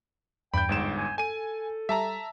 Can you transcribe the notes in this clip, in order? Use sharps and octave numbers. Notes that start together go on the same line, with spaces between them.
E2 G2 G5 B5 G6
G1 G#2 E7
G#5
A4 G#5 D#7
G3 E5 A5 A#5